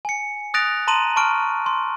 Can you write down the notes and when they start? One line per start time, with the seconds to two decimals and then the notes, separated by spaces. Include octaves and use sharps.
0.05 G#5 C#7
0.54 D#6 F#6 A6 A#6 D7 F7
0.87 A5 A#5 C6 D#7 F#7
1.16 A5 C6 C#6 F6 D7
1.66 C6